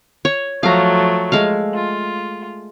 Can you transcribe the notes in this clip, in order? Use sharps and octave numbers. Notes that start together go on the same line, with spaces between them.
C#5
F3 F#3 A3 F5 A#5
G#3 A3 F5
F4